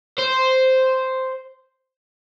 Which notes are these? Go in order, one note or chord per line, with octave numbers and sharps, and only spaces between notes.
C5